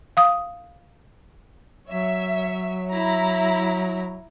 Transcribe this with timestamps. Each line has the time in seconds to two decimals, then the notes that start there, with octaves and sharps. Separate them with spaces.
0.17 F5 D#6
1.90 F#3 C#5 E5
2.92 E4 A#5